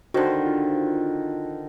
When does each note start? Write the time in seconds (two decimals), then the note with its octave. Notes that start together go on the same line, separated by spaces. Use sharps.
0.14 D3 D#3 F#4 C5
0.46 F4